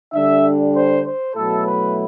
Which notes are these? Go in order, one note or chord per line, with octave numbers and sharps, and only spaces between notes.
D3 G3 D4 E5
C5
C5
B2 F#3 A3 E4 A4
B4